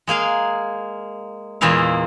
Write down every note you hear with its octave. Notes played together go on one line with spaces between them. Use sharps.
G#3 A#3 G#4 F5
E2 A#2 G#3 E4 F5